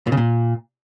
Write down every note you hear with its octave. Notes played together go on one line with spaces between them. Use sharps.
A#2
C#3
A#2